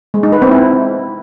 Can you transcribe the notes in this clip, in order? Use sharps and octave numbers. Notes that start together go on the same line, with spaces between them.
G#3
D#4
B4
C4
E4